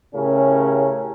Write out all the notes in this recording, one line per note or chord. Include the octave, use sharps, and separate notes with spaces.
A2 C#3 C#4 G4 A#4